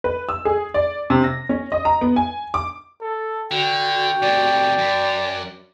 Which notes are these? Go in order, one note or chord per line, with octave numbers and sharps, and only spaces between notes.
B4
E6
G#4
D5
C3
A#6
C#4
D#5
A#5
B3
G#5
D6
A4
D3 F#4 G5
A2 C3 D5
F#2